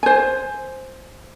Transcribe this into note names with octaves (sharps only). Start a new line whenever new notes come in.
C5 G#5